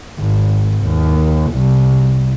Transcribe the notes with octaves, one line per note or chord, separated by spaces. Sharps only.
G#1
D#2
C2